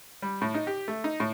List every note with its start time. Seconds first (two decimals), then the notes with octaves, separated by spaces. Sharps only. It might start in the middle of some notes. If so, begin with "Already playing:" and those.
0.22 G3
0.42 A2
0.54 D#4
0.67 G4
0.88 A3
1.04 D#4
1.20 A2